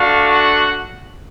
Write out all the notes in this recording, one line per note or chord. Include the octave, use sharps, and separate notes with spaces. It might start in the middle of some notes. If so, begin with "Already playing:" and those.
Already playing: A3 D4 F#4 F5
F#5